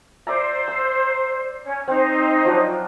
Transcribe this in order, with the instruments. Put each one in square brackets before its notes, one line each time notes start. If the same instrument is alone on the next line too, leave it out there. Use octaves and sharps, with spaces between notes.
[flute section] C5 [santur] D5 E5 A#5
[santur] E6
[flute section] C#4
[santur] C4 [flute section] D#4 C5
[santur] F3 F#3 D4